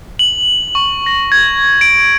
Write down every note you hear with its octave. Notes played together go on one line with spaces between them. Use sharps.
F#7
C#6
A#6
G#6
D7